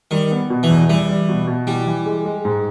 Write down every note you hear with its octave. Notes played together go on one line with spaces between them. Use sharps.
D#3 G3
B3
B2
E3
E2
E3 G3
G3
B2
B2
E3 G3
E3
G#3
G#3
G#2